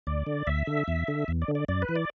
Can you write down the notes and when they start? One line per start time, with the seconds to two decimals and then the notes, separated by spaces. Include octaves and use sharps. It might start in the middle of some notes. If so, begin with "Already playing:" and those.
0.07 D2 D5
0.26 D3
0.47 D2 E5
0.67 D3
0.88 E2
1.08 D3
1.28 E2
1.42 D5
1.48 D3
1.55 D5
1.68 F#2 D5
1.82 B4
1.89 E3
1.96 D5